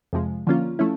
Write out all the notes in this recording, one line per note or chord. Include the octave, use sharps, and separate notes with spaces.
F2 C3 F3 G#3
D3 F3 A#3 C#4 F4
F3 A3 C#4 E4